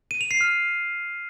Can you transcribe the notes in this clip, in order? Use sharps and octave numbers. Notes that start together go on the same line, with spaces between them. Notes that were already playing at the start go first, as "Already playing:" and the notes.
D#7
F7
C7
F6